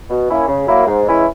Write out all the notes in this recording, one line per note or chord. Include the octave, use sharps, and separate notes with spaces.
B2
A#3 C#4 E4
C#3
F#3 A#3 E4
G#2
E3 G#3 C#4 E4